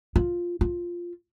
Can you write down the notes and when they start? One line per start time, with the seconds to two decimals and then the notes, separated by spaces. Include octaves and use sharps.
0.16 F4
0.61 F4